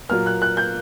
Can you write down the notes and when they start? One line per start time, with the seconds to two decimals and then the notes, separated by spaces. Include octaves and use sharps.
0.09 A#2 F#3 A#3 F6
0.26 F#6
0.42 F#6
0.57 G6